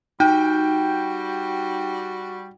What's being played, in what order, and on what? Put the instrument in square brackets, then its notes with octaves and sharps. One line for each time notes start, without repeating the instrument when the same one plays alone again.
[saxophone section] G3 F#4 [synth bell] D#4 [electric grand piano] G5